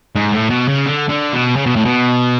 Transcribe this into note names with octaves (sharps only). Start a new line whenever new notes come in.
G#2
A2
B2
C#3
D3
D3
B2
C#3
B2
A2
B2